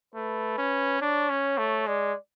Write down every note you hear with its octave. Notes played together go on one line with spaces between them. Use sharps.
A3 B4
C#4
D4 C#5
C#4
A3
G#3 D5